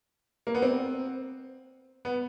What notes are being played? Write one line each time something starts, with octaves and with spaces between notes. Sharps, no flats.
A#3
B3
C4
B3